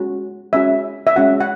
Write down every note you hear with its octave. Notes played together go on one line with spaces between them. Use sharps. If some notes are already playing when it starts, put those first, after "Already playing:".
Already playing: G#3 C#4 F#4
G#3 C#4 F#4 E5
E5
G#3 C#4 F#4 F#5
F#5